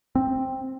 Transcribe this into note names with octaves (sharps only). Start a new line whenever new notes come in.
C4